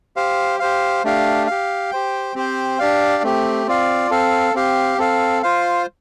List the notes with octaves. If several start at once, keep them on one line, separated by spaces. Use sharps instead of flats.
G4 C5 F5
G4 C5 F5
A3 D4 G4 F5
G4 F5
G4 C5 G5
C4 G4 C5 G5
D4 G4 D5 F5
A3 C4 G4
C4 F4 D5 F5
C4 A4 F5
C4 G4 F5
C4 A4 F5
F4 C5 F5